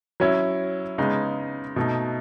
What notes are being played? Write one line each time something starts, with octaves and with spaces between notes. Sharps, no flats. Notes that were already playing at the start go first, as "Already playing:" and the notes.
F#3 C#4 E4
C#3 G#3 B3 D#4
B2 A3 D#4